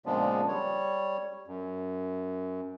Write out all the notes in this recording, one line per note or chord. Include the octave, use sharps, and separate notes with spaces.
A#2 C#3 F3 G#3 B3 D4
G3 C#5
F#2